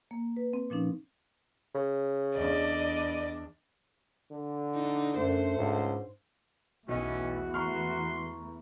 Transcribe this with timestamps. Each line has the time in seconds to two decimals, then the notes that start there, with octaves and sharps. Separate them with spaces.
0.11 A#3
0.37 B4
0.53 C4
0.70 A#2 F3 C#4 D#4
1.75 C#3
2.36 E2 D4 D5 D#5
4.32 D3
4.75 D4 D#4
5.17 F#2 A3 C5
5.58 C#2 G#2
6.88 B1 E2 E3 A3 C#4 F#4 D#5
7.54 A#5 C6 C#6 F6